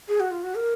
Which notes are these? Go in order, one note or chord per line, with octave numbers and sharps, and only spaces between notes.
G#4
F#4
F4
F#4
A#4